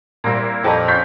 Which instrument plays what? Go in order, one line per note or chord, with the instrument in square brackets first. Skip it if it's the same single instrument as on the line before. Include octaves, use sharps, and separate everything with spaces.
[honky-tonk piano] A#2 G3 [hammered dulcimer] A#3 C4 E4
[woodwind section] F2 [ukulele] G4 B4 A5 [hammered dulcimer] F#5 A#5
[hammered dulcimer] C#4 F4 [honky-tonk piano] C#6 G6 B6